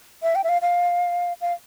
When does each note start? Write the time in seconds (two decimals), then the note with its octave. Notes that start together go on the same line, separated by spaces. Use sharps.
0.23 E5
0.35 G5
0.44 E5
0.49 F5
0.62 F5
1.41 F5